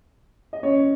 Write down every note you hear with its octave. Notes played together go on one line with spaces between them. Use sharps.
D#5
C#4 C#5